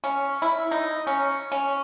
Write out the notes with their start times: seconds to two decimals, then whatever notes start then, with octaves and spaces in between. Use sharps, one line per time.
0.04 C#4
0.42 E4
0.71 D#4
1.07 C#4
1.52 C#4